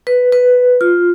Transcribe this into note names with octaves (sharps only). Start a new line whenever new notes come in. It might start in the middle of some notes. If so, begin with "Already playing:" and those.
B4
B4
F4